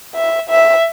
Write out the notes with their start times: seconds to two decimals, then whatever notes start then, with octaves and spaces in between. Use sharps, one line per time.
0.15 E5
0.50 E5